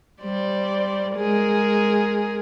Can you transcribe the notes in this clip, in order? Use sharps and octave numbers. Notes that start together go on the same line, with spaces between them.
G3 C5 D5
G#3 G#4 A#4